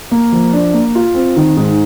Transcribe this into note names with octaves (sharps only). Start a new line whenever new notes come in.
A#3
F3
D4
A#3
F4
C4
D#3
G#2